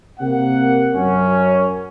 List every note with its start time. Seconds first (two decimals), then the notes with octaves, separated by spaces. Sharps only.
0.19 C3 A#3 F#5
0.94 F#2 C#4